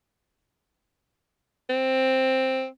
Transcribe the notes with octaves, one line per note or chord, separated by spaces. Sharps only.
C4